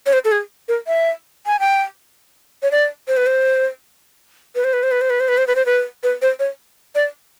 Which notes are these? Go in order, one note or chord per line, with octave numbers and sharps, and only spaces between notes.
C#5
C5
A4
G#4
A#4
E5
G#5
G5
C#5
D5
C5
B4
C5
B4
C5
B4
C5
B4
C5
B4
C5
B4
C5
B4
C5
B4
B4
C5
C#5
D5